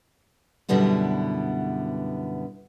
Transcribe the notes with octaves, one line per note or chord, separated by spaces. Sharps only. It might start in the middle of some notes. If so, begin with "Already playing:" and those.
F#2 B2 D3 G3 B3 E4